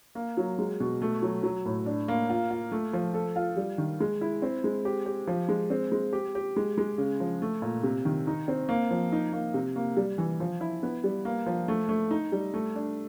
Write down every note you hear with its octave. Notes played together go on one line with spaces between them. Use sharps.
A#3
F#3
G#3
B2
A3
F#3
F#3
A2
D4
A#3
F4
F4
A3
F3
A4
F4
G3
D#3
G#3
E4
C4
G#3
G4
G4
F3
G#3
C4
G#3
G4
G4
G#3
G#3
C#3
F3
A3
A#2
C3
D#3
D#4
C4
A#3
F3
D#4
A#3
C3
A#3
G3
E3
F3
E4
B3
G3
A#3
F3
A3
A3
D#4
G3
A3
D4